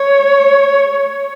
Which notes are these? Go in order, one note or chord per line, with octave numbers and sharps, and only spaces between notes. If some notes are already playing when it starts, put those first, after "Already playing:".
Already playing: C#5